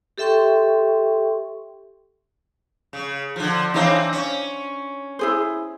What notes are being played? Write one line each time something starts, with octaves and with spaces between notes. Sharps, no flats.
G4 A4 E5 G5 C6 C#6
C#3
D3 F3
E3 C4 D4 D#4 C#5 F5
C#4
E4 G#4 C5